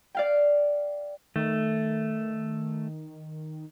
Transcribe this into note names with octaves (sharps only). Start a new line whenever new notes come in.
D5 F5 G5
D#3 A3